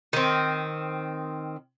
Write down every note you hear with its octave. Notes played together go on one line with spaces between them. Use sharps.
D#3 C4